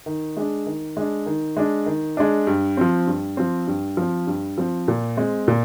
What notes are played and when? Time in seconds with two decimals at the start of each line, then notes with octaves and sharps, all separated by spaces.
0.06 D#3
0.37 G#3 D4
0.66 D#3
0.97 G#3 D4
1.26 D#3
1.57 G#3 D4
1.86 D#3
2.17 G#3 D4
2.47 G2
2.77 F3 C4
3.07 G2
3.37 F3 C4
3.67 G2
3.97 F3 C4
4.27 G2
4.58 F3 C4
4.88 A#2
5.17 G#3 C4
5.48 A#2